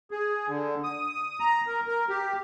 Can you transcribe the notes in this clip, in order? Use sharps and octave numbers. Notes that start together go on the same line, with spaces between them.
G#4
D3
D#6
A#5
A#4
A#4
G4